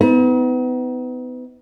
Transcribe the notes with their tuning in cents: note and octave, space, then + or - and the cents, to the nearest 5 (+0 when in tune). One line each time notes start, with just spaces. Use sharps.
B3 +30 D#4 +40